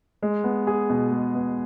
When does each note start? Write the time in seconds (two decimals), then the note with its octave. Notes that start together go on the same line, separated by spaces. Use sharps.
0.23 G#3
0.44 B3
0.67 G#4
0.90 B2
1.12 G#3
1.35 B3